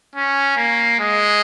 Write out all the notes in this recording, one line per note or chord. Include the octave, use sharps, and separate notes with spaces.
C#4
A#3
G#3